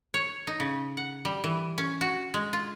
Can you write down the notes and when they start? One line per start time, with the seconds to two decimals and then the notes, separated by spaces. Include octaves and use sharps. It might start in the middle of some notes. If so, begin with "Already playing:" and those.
0.14 C#5
0.47 D#4
0.60 C#3
0.97 F#5
1.25 G3
1.44 E3
1.78 C#4
2.01 F#4
2.34 G#3
2.53 F4